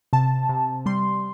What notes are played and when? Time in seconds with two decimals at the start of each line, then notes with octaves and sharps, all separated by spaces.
0.13 C3 A5
0.49 C3
0.86 G3 C6